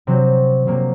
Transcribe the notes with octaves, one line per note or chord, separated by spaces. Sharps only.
C3 F#3 C4
C3 F#3 A#3